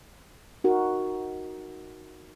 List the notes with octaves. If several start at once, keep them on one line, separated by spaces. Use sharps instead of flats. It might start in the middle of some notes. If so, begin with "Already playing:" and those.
D#4 F#4 A#4